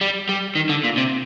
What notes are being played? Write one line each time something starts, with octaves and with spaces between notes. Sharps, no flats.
G3
G3
D#3
D3
A#2
C3